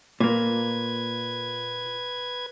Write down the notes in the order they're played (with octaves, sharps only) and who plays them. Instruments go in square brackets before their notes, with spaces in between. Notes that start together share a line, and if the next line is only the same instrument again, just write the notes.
[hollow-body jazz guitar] A#2 A#3 [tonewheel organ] B4 G#6